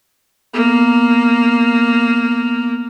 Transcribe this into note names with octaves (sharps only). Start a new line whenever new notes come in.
A#3 B3